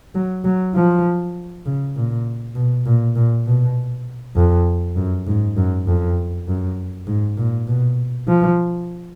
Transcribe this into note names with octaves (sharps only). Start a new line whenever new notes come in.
F#3
F#3
F3
C#3
A#2
B2
A#2
A#2
B2
F2
F#2
G#2
F#2
F2
F#2
G#2
A#2
B2
F3